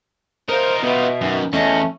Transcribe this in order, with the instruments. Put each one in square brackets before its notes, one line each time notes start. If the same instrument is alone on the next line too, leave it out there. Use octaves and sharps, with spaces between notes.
[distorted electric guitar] D#4 F4 [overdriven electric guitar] A#4 [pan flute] C5
[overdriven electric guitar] B2 [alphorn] B3 [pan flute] E5
[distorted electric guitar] F#2 [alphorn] D#3
[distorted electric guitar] E2 [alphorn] A3 [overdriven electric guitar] C#4 [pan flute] D#5